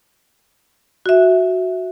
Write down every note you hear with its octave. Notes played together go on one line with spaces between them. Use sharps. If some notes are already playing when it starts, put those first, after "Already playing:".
F#4 E5